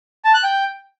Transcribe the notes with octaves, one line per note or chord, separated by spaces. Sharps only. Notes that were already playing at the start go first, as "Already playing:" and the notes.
A5
F#6
G5